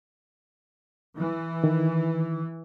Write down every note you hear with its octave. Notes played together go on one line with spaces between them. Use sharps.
E3
D#3